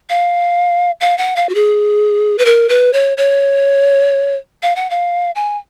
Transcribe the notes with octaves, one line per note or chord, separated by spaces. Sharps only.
F5
F5
F#5
F5
F#4
G#4
B4
A#4
B4
C#5
C#5
F5
F#5
F5
G#5